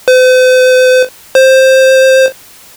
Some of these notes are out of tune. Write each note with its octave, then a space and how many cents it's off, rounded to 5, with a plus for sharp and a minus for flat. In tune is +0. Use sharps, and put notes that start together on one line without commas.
C5 -45
C5 +10